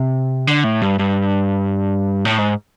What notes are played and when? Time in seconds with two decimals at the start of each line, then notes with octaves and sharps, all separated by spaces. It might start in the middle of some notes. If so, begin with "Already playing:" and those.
Already playing: C3
0.47 D3
0.64 A2
0.82 G2
0.99 G2
2.25 A2
2.38 G#2